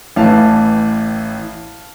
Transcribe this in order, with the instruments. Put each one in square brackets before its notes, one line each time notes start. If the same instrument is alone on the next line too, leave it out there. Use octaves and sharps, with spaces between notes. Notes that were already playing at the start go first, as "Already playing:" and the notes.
[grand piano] A1 A2 E3 F5 A5